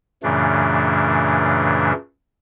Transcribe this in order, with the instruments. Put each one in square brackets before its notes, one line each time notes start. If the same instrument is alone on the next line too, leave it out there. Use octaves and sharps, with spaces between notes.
[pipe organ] F#2 A#2 C#3 E3 A3 D4